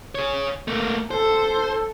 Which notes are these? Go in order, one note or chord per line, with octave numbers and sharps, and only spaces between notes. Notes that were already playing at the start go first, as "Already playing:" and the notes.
G#4 C#5
A3 A#3
A4 C5